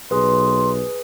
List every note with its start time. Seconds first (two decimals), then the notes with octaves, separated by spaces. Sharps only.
0.11 B1 G#4 B4 C6